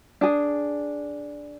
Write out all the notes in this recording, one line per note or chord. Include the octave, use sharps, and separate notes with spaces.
D4 G#4